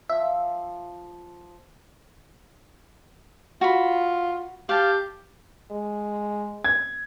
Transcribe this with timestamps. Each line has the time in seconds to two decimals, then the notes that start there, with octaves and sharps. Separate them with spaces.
0.10 F3 F4 E5
3.61 F4 F#4 B5
4.69 G4 F5 A5
5.71 G#3
6.64 G#6